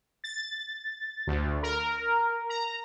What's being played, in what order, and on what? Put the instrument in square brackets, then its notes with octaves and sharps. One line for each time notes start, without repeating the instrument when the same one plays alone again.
[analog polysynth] A6
D2
A#4
A#5